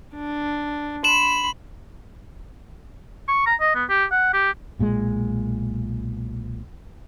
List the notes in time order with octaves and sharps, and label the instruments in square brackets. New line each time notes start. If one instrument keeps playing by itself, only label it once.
[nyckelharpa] D4
[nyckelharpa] B5 C6 [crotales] E7 F#7
[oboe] C#6
A#5
D#5
B3
G4
F#5
G4
[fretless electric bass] B1 A#2 F3 G#3